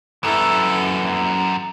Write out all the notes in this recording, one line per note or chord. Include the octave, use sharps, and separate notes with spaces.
F#2 E3 E4 A4